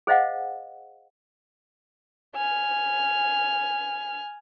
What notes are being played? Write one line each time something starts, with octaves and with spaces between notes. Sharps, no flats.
G#4 C5 D#5 F5 F#5
G#5 F6